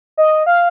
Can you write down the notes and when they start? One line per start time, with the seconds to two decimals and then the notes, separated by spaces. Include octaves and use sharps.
0.17 D#5
0.46 F5